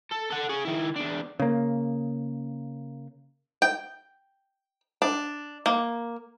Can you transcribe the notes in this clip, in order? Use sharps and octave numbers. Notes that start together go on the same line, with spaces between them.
A4
A4 F#5
G#4 C#5
D#3 E4
E2 D4
C#3 A#3
G5
D4
A#3